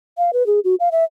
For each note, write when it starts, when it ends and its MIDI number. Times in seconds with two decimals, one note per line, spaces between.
0.18 0.31 77
0.33 0.45 71
0.47 0.60 68
0.64 0.75 66
0.80 0.89 77
0.92 1.04 76